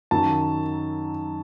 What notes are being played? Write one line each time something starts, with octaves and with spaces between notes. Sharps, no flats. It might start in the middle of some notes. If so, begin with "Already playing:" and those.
F#2 D#3 F#3 A5